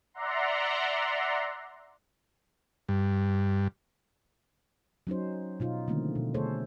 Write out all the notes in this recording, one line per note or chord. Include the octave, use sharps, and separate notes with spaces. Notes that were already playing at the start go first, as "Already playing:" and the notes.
D5 E5 F#5 A#5 C6
G2
F#3 C#4 D#4 C5
B2 D#4 F4
D3 D#3 F3 A3 A#3 C4
B2
D3 A3 G#4 A4 C5 C#5